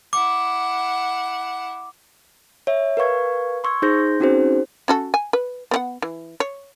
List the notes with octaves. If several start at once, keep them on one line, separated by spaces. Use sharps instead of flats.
E4 F#5 D6
C#5 E5
A#4 B4 F5 C#6 G#6
C6 C#6 E6 G#6
D#4 G#4 C5 C6 G6 A#6
C4 C#4 D#4 F#4 G#4 C5
C#4 F#4 A4
G#5
B4
B3 C4 F#5
E3
C#5